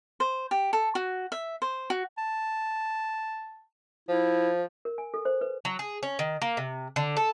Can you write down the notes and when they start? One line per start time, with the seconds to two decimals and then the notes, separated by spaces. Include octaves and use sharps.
0.20 C5
0.51 G4
0.73 A4
0.95 F#4
1.32 E5
1.62 C5
1.90 F#4
2.18 A5
4.09 F3 E4
4.85 A#4
4.98 G#5
5.14 A4
5.25 C5
5.41 B4
5.65 F#3
5.79 G#4
6.03 C#4
6.19 D#3
6.42 A#3
6.57 C3
6.96 D3
7.17 A4